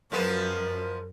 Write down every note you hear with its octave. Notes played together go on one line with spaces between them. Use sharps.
F#2 F3 G#3 B3 A#4